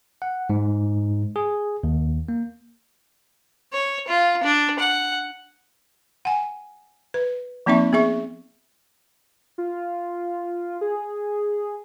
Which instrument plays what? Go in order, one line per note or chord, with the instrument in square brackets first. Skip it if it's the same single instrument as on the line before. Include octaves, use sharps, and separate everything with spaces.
[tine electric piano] F#5
G#2
G#4
D#2
A#3
[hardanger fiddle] C#5
F4
D4
F#5
[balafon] F#5 G#5
B4
F3 A#3 C4 D#4 E5 C#6
B3 G#4 E5 C#6
[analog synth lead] F4
G#4